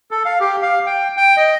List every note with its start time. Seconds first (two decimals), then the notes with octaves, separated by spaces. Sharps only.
0.11 A4
0.25 F5
0.40 G4
0.62 F5
0.86 G5
1.17 G5
1.37 D#5